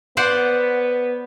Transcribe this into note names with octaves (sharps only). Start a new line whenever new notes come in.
B3 C5 D5 F#5